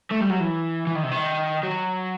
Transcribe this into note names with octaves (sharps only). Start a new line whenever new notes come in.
A3
G3
F#3
E3
E3
D#3
C3
D#3
F#3